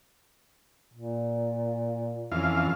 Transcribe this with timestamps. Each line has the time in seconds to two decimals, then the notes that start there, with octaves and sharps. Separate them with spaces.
0.94 A#2
2.32 F2 E3 C#4 F5